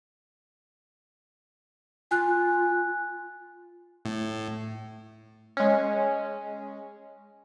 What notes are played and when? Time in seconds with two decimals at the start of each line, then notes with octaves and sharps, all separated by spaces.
2.11 F4 G#5 F#6
4.05 A2
5.57 G#3 C#4